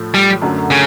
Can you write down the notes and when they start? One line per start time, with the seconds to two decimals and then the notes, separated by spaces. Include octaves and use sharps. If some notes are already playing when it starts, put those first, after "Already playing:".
Already playing: A2 F3 A3
0.14 G3
0.42 F#2 D3 F#3 A3
0.71 C#3